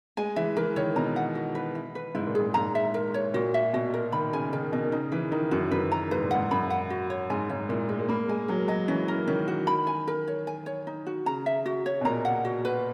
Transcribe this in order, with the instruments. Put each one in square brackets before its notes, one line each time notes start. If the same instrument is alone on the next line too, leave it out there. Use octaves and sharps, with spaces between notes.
[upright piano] G#3 [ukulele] G#5
[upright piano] E3 [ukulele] E5
[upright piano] E3 [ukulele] A#4
[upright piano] D#3 [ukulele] C#5
[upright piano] B2 [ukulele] A#5
[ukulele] F#5
F#4
B4
E4
B4
[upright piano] G#2 [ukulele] E4
[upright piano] A#2
[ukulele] G#4
[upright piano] G#2
[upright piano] G#2 [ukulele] A#5
[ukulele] E5
A#4
C#5
[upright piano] A#2 [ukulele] F#4
[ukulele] E5
[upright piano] B2 [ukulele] F#4
[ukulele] A#4
[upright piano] D#3 [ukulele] B5
[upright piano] C#3 [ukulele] G#5
[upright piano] D#3 [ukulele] A#4
[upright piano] B2 [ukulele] D#5
[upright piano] D#3
[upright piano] C#3 [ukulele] D#4
[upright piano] E3 [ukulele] B4
[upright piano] D#3 [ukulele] D#4
[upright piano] F#2 [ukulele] F#4
[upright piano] F#2 [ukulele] B4
[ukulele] A#5
[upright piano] G#2 [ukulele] B4
[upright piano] A#2
[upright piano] G#2 [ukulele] F#5
[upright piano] F#2 [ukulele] B5
[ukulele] F#5
F#4
C#5
[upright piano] G#2 [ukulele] G#5
[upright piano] G#2 [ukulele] C#5
[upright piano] A#2 [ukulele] E4
[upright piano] G#3 [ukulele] A#4
[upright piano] G#3
[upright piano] A#3 [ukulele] B5
[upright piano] G#3 [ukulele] G#5
[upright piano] F#3 [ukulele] A#4
[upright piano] F#3 [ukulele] D#5
[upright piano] E3 [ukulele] C#4
[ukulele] A#4
[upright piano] D#3 [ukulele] C#4
[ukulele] F#4
B5
G#5
A#4
C#5
G#5
C#5
D#4
F#4
[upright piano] C#3 [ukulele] A#5
[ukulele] E5
F#4
C#5
[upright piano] B2
[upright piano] A#2 [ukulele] A#5
[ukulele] F#5
F#4
B4